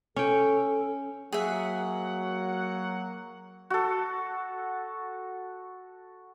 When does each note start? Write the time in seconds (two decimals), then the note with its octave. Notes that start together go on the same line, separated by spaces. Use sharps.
0.16 C#4 A4 G5
1.32 F#3 A#3 G#4 E5 F#5
3.70 F#4 A4